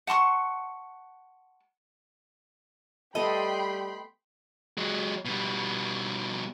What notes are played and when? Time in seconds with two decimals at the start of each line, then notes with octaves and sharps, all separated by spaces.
0.07 F#5 A5 C6 C#6
3.15 G3 A3 B3 A4 D#5 G5 B5 C6
4.77 F#3 G#3
5.25 B2 G3